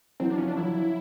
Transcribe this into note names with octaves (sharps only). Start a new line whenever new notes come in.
E3 F#3 C4
D4
F3 C#4
D4
E3 F#3 E4